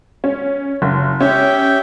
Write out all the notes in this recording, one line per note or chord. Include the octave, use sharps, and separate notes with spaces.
C#4
F#1
C#4 G4 E5 G5